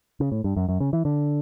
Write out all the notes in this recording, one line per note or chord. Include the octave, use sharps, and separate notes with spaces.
C#3
A2
G2
F#2
F#2
C#3
E3
D3